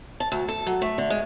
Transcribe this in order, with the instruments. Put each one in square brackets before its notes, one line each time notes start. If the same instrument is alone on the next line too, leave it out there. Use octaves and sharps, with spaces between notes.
[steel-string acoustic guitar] A5
D2
A4
F#3
A3
D3
G#3